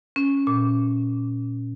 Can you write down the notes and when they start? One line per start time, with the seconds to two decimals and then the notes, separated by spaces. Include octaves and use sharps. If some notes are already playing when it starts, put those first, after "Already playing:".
0.16 C#4
0.47 A#2